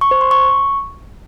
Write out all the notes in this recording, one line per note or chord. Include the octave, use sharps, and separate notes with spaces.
C#6
C5
C6
C#6